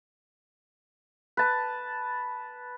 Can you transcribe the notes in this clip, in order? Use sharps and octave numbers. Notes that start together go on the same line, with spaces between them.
B4 A5